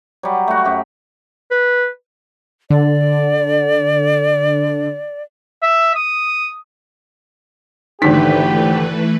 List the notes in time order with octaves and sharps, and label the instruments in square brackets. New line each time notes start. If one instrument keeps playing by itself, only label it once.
[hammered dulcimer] F#3 G3
A3 F#4
F#2 G4
[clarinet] B4
[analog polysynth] D3 [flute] D5
[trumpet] E5
D#6
[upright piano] G#1 D3 B6 [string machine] E3 A3 B4 [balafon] D#4 [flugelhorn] G4